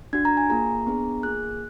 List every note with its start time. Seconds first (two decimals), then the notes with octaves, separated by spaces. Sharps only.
0.13 D4 F#4 G#6
0.25 A#5
0.37 G#5
0.50 A#3 F4 G#4 A#5
0.86 B3 D4 G#4
1.23 A#3 F4 G#4 F#6